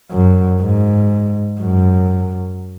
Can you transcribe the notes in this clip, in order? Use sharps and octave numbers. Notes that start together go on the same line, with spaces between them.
F#2
G#2
F#2